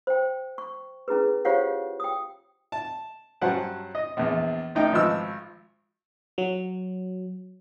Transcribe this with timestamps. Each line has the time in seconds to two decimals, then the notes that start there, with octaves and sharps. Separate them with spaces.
0.07 C5 G5
0.58 C#6
1.08 C#4 E4 G#4 B4
1.45 F4 G4 C5 C#5 F5 F#5
2.00 G5 D#6
2.72 A5
3.41 G2 F#3 C#4 C5 F#5 A5
3.95 D#5
4.17 A#1 E2
4.75 A1 D#4 G5
4.93 G#1 F3 B4 E6
6.38 F#3